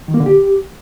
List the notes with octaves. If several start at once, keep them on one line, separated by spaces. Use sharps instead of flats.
D#3
A#3
D3
G4